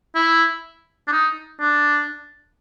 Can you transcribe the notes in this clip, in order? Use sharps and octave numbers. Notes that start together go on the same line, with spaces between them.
E4
D4
D#4
D4